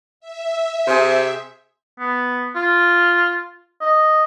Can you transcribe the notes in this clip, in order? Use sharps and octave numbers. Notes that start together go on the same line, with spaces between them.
E5
C3 G#4 C5
B3
F4
D#5